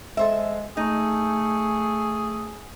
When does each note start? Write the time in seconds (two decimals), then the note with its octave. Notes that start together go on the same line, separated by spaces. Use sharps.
0.17 G#3 A4 C5 E5
0.77 A3 D#4 G#4